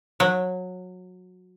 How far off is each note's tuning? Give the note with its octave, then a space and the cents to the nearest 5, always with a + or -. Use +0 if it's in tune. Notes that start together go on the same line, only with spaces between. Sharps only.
F#3 -20